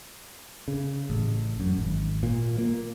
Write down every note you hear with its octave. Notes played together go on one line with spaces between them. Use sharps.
C#3
A1
F#2
G#1
A#2
A#3